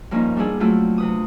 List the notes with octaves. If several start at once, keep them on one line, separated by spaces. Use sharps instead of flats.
G2 F3 A#3 C#4 D#4
G3 B3 D4 E4 G#4
F#3 A3 C4 E4 F4 G4
C3 B4 D#6